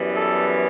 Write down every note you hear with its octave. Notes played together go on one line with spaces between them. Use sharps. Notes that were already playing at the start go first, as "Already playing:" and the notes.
Already playing: F#2 E3 G3 B3
A4